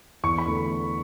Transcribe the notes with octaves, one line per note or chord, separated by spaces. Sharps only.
E2 C#6
B5
D3 A3